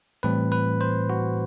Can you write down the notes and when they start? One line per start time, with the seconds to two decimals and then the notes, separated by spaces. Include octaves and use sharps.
0.23 A2 E3 G3 C4 B4
0.52 B4
0.81 C5
1.10 F#4